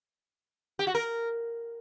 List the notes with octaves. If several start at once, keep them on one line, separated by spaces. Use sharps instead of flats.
G4
F#4
A#4